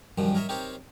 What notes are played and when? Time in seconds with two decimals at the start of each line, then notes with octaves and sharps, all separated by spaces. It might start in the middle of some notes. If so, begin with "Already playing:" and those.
0.18 F#2 D#3 F3 G3
0.35 A#4 C#5 D#5 E5
0.49 C4 D#4 G4 A#4 C5 C#5